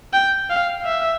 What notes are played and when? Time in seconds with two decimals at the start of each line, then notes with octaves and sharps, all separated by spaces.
0.13 G5
0.50 F5
0.85 E5